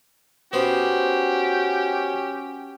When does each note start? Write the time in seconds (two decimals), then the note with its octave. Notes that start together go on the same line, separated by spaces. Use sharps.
0.53 B3 C#4 F#4 G4 C5